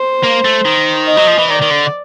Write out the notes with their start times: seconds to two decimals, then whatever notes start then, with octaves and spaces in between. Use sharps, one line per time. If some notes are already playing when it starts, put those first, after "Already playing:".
Already playing: C5
0.23 A#3
0.44 A3
0.65 D#3
1.08 D#5
1.17 F#3
1.27 F3
1.38 E3
1.50 D#3 D5
1.62 D#3
1.71 D3